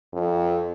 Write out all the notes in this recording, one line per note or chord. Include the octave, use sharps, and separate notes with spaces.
F2